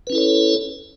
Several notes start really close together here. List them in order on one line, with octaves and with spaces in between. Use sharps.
B4 C#4 E4 A4 C#5